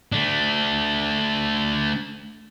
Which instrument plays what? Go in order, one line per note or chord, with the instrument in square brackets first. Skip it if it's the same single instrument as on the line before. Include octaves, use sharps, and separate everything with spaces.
[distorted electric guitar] A3 D4